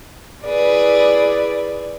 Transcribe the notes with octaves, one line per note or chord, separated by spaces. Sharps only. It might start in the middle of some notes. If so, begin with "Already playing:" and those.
E4 G#4 B4 D5